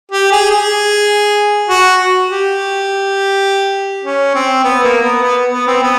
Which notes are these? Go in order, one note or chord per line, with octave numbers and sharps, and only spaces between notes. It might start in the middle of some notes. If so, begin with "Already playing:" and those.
G4
G#4
G#4
F#4
G4
C#4
C4
B3
A#3
B3
B3
B3
C4
B3